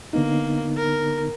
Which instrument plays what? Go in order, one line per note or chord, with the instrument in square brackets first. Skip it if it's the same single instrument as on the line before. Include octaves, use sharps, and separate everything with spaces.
[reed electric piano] D3 B3 D#4 [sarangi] A#3
[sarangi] A#4